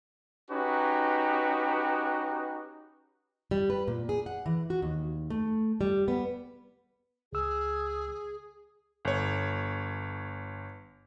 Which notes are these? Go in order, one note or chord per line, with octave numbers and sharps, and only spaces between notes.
C#4 D#4 F#4 G4 B4
G3
B4
A#2
G#4
F#5
E3
F#4
D#2
A3
G3
B3
C#2 G#4 E6
G1 C#5